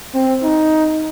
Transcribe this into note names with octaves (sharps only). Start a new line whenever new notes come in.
C4
D#4